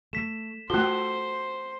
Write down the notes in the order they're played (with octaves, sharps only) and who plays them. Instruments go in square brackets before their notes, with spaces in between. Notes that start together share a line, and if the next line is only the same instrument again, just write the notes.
[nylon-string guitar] A3 [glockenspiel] B6 E7
[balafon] A3 F4 [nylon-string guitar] F#4 A4 [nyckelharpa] C5 [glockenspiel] G7